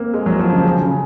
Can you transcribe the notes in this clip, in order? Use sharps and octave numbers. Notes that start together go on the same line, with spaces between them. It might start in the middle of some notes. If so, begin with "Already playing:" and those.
Already playing: A#3 C4
G#3
F#3
F3
C#3
C#3
C#3